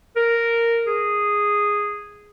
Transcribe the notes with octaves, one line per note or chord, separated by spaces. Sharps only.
A#4
G#4